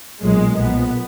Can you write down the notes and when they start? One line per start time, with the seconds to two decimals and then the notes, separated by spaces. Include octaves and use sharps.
0.20 B1 A#2 F#3 G#3
0.57 B1 A#2 F3 B3